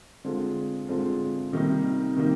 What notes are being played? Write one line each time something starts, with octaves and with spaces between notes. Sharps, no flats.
D3 G#3 C4 F4
D3 G#3 C4 F4
C3 D#3 G3 A#3 D#4
C3 D#3 G3 A#3 D#4